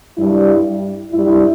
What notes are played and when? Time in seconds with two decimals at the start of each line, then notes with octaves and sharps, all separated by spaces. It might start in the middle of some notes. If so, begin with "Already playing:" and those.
0.18 G2 G3 E4
1.12 G2 G3 E4